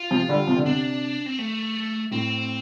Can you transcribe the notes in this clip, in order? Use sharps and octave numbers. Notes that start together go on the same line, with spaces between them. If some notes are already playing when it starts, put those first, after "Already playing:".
Already playing: F4
C3 F3
D3 G3
C3 F3
D3
C3 D4
C4
A3
A2 C4